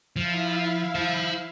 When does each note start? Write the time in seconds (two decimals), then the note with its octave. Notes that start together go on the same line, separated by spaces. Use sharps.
0.16 F3 E4 E5 F5
0.95 C5 A5